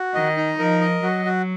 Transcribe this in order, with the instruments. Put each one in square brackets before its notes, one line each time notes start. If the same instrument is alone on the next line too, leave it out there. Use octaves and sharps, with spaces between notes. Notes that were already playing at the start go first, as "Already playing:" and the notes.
Already playing: [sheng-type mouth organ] F#4
[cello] D#3 [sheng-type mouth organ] D#5
[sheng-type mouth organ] D#4
[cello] F3 [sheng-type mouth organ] A#4
[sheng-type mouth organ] D#5
[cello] F#3 [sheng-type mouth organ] F#4
[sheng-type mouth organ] F#4